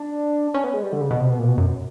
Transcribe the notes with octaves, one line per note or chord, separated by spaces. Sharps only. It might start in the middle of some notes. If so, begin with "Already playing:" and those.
Already playing: D4
C#4
B3
G#3
G3
D3
C#3
B2
C3
B2
A#2
B2
F#2